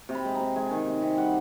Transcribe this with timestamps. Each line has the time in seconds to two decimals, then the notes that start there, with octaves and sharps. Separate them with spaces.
0.09 C3
0.15 B5
0.25 G#3
0.35 A#5
0.40 C3
0.56 G#3 G#5
0.71 D#3
0.87 C3
1.02 C3
1.18 G3 F#5